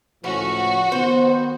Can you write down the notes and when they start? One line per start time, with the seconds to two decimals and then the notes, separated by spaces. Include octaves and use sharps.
0.24 C#2 A2 F3 C#4 F#4
0.92 D#3 B3 C5